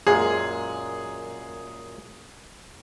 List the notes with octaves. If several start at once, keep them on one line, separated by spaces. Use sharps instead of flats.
F#2 A#2 G#3 G#4